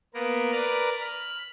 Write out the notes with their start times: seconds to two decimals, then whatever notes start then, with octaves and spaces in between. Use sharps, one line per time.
0.14 A#3 B3 A#4
0.52 A#4 B4 D5 A#5
1.01 B5 F6